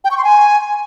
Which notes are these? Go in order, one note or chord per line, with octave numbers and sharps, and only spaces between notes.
G5
C#6
C6
G#5